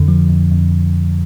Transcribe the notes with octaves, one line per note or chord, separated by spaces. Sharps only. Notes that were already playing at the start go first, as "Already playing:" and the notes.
Already playing: F2 D3
F3
F2
F2